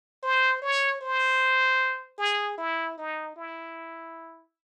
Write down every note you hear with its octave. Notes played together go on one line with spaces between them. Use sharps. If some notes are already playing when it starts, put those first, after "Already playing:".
C5
C#5
C5
G#4
E4
D#4
E4